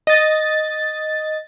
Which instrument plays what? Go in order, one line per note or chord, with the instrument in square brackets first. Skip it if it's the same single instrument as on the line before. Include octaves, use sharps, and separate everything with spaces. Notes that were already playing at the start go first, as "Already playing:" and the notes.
[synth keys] D#5 A6